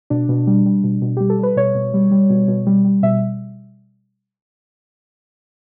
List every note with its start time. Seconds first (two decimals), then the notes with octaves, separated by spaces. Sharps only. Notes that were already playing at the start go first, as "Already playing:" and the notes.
0.10 B2 D4
0.29 B2
0.47 G3
0.66 G3
0.84 B2
1.02 B2
1.17 G3 G4
1.30 A4
1.39 G3 B4
1.56 B2 C#5
1.75 B2
1.94 G3
2.11 G3
2.30 B2
2.48 B2
2.67 G3
2.85 G3
3.03 B2 E5